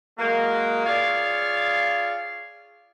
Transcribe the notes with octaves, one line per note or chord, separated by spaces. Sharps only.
F#3 G#3 A#3
F4 G#4 C#5 D5 F5